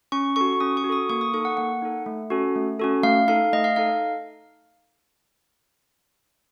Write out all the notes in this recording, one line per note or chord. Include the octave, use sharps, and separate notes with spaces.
C#4 C#6
F#4 A4 C#6
C#6
C#4 D#6
C#6
F#4
A4 D#6
A#3 C#6
D#6
D#4 A4 C#6
F#5
A#3 F#5
D#4 A4
A3
C#4 F#4 A4
A3
C#4 F#4 A4
A3 F5
D#4 A4 F5
A3 D#5
F5
D#4 A4 F5